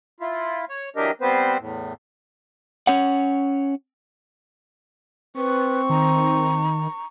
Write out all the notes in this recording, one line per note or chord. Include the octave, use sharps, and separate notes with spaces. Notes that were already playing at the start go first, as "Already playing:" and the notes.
E4 F4
C#5
E3 F#3 D4 G4 A#4 D#5
G3 B3 C4 B4 C5
E2 A2
C#4 C#5 F#5
C4 B4 C#6
D#3 A#5